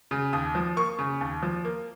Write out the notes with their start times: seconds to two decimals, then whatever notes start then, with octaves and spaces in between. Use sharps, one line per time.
0.11 C#3
0.33 D#2 D#6
0.55 F3
0.76 A#3 C#6
0.99 C#3
1.21 D#2
1.43 F3
1.65 A#3